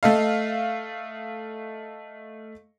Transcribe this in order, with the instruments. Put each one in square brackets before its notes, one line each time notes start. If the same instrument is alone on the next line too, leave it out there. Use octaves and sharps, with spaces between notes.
[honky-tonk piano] A3 A4 D#5 F5